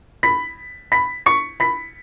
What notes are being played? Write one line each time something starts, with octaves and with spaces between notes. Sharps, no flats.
B5 B6
B5 B6
C#6 C#7
B5 B6